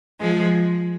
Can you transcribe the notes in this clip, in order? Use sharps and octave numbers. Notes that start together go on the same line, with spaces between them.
F3 G#3